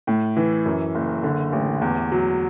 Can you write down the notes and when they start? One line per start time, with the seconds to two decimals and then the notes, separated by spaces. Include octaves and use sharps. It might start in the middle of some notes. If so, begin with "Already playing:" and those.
0.07 A2
0.37 E3
0.66 F#2
0.95 F#1
1.23 D3
1.53 A1
1.82 E2
2.12 F#3